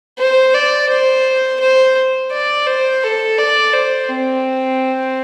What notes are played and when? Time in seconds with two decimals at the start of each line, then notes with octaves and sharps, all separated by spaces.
0.18 C5
0.54 D5
0.89 C5
1.60 C5
2.31 D5
2.67 C5
3.03 A4
3.38 D5
3.74 C5
4.09 C4